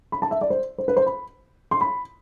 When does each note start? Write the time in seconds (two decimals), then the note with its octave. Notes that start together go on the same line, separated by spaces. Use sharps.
0.12 B5
0.22 A5
0.31 E5
0.41 D5
0.50 C5
0.78 C5
0.88 B4
0.97 C5
1.07 B5
1.71 C6
1.81 B5